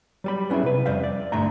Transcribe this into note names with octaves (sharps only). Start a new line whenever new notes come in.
F#3 G3 B5
B3 C#4 E4 G#4 E5
C3 B4
F2 G3 C5 E5 F5
D5
B1 G2 D3 A3 E5 A#5